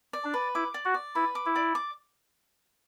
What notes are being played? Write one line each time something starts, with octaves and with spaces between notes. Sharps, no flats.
D5
D4
B4
E4 D6
D5
F#4
D5
E4 B4
D6
E4
D5
D6